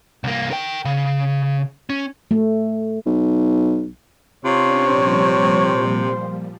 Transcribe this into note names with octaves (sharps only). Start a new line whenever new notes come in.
C2 A#3
A#4 G5
C#3
C#4
A3
B1
C3 C#4 D4 F4 C#5
A#2 F3 G3 C5